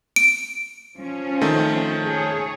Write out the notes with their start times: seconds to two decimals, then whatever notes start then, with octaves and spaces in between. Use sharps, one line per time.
0.16 D7
0.97 F3 C#4
1.41 D#3 A3
2.06 G#4 C#5